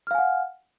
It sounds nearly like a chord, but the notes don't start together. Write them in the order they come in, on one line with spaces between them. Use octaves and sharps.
F6 F5 G#5 F#5